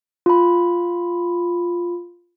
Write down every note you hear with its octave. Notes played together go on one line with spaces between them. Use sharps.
F4 B5